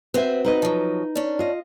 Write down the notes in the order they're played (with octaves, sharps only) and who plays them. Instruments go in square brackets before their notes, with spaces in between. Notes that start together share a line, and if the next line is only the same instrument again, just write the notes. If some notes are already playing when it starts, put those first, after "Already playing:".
[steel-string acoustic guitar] C4 F#4 [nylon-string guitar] B4 C5 E5
[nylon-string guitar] D#4 B4 D#5
[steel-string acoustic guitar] F3 F#3
C#4 D4
[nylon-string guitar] F4 D#5